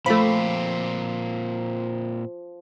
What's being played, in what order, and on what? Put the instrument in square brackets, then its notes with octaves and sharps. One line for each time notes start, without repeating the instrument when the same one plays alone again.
[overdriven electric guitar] A#2 C4 [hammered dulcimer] F3 D6 [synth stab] A3 B5